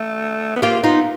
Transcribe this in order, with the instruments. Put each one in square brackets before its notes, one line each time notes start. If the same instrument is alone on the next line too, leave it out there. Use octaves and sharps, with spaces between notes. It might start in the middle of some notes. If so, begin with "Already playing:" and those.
Already playing: [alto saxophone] A3
B3
[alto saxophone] A#3 [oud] F4 G4
[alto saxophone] B3 [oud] D#4 F4